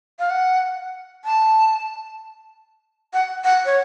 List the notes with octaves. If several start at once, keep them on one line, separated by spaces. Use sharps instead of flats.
F5
F#5
A5
F#5
F#5
C#5